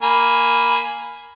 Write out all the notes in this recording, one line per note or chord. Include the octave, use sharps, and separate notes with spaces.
A#3 G#5 B5